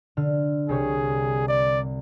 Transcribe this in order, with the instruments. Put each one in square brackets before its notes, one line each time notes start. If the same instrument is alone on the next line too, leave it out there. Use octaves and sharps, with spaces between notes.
[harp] D3 F6
[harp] C2 G4 C#5 [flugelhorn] G#4
[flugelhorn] D5